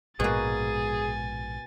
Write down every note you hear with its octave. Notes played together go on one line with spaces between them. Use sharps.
A#1 G#2 B2 G#3 A#3 G#4 G#5 A6